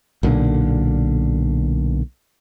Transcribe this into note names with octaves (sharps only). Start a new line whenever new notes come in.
B1 A#2 D3